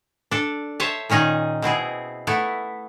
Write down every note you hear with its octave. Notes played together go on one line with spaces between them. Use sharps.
D4 A4
C5 C#5 E5 A5
A#2 D#3 C#4 D#4 G#4
B2 C4 E4 G#4
A3 B3 E4